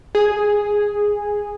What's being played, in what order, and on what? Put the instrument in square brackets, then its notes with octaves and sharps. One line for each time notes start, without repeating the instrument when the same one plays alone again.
[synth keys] G#4